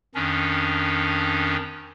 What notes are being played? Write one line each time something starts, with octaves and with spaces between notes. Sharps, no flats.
F2 D#3 C#4 D4